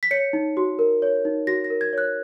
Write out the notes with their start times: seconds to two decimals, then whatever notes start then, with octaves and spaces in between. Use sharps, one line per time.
0.03 B6
0.11 C#5 C#7
0.33 D#4
0.57 F#4
0.79 A#4
1.02 C#5
1.25 D#4
1.47 F#4 A#6
1.64 A#6
1.70 A#4
1.81 G#6
1.93 C#5 F#6